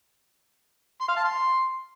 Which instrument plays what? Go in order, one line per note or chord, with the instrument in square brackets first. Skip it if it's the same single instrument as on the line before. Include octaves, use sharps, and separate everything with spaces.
[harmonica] C6
F5
A5
C6